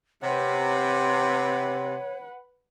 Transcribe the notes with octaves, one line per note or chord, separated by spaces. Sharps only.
C3 B4 C#5 F#5